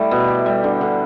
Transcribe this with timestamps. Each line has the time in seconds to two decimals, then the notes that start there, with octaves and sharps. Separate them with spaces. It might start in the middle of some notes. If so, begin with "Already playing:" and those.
Already playing: G3 A3 E4
0.11 B2
0.28 G4
0.46 G3
0.64 D3
0.81 D3